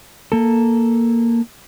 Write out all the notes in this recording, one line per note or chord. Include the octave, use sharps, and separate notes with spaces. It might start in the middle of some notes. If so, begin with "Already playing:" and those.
A#3 A4